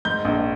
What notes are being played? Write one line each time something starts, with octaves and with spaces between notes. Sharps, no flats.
G#2 G6
A#1